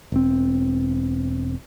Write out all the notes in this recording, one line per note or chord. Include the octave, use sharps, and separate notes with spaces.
E1 C4